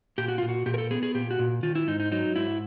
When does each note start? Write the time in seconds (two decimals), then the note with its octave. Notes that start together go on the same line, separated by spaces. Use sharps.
0.18 A#2 G4
0.28 F#4
0.38 A#2 F4
0.49 F#4
0.66 A#2 G4
0.74 A#4
0.78 A4
0.91 B3 G#4
1.03 G#4
1.14 A#2 G4
1.31 F#4
1.39 A#2
1.63 D#3 F4
1.75 E4
1.88 G#2 D#4
2.00 D#4
2.12 F#3 D#4
2.36 G#2 E4